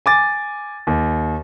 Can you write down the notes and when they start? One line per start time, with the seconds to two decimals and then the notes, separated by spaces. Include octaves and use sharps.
0.06 G#5 D6 A6
0.87 D#2